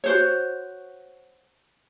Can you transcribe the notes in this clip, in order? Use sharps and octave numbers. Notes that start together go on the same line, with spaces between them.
F#4 C5 C#5